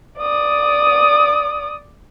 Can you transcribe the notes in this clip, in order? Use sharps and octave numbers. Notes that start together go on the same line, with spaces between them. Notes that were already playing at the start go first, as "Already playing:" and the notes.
D5 D#6